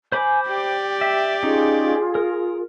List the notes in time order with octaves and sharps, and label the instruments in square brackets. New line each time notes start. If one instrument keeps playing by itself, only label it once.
[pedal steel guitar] C5 B5 D6 [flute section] G#5
[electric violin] G4 D5 [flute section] G5
[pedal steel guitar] E5
[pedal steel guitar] C#4 D#4 [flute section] F4 G#4
[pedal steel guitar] A#4